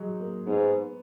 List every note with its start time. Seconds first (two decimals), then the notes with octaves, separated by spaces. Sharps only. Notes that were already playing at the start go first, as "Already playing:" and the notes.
Already playing: F#3 G#3 D#4
0.20 A#3
0.46 G#2 B3